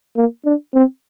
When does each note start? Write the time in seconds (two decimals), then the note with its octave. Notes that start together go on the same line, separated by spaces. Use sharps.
0.16 A#3
0.45 D4
0.74 C4